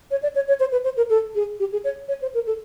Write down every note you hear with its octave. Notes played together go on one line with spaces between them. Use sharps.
C#5
D5
C#5
C#5
C5
B4
C5
A#4
A4
G#4
G4
G#4
C#5
C#5
C5
A#4
A4